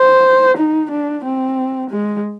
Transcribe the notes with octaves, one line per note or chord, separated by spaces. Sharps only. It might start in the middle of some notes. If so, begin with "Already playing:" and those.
Already playing: C5
D#4
D4
C4
G#3